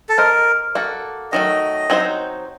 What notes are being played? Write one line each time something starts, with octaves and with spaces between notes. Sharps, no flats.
A4
C4 G4 A#4 C5 D#5
A#3 F#4 A4
D#3 F#3 A3 D#5
F#3 C4 D#4 F#4 C5